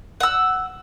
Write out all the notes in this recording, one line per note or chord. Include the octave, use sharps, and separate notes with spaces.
F#5 E6